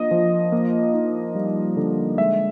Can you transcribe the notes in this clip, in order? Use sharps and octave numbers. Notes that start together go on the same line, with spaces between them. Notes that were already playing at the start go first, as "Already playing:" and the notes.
Already playing: F3 A#3 D4 D#5
F3
A#3
D#4
G3
D3
G#3 E5